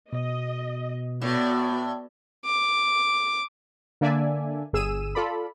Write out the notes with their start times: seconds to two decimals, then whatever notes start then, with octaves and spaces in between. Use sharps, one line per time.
0.13 B2 D#5
1.21 A2 B3 F#4 D5
2.46 D6
4.01 D3 A#3 D4 D5 E5 G#5
4.73 G1 G#4 E6 D#7 E7
5.15 F4 A4 D5 B5